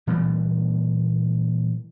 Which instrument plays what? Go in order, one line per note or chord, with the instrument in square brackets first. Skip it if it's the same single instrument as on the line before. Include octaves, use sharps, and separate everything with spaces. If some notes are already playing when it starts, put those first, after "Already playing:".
[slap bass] A#2 E3 G3 A#3